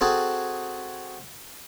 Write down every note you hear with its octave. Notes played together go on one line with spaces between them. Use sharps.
C4 F#4 G#4 A4